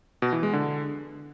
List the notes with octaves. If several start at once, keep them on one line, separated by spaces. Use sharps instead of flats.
B2
E3
G#3
D3